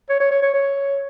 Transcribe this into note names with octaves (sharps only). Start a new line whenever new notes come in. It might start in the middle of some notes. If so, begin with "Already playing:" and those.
C#5
C#5
C#5
C#5
C#5